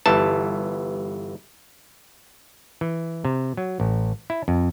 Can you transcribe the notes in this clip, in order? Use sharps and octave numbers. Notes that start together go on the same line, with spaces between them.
G1 E3 A5
E3
C3
F#3
A1
E4
F2